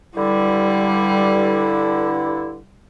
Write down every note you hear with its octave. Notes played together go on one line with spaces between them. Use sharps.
G2 D3 G3 E4